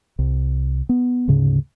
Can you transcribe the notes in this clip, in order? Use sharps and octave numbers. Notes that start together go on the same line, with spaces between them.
C2
B3
D2 G#2 C#3